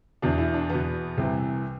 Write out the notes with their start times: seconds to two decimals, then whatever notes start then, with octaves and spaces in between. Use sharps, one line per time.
0.22 E2 B2 D4
0.38 E4
0.54 D4
0.70 E2 B2 B3
1.18 C2 C3 E3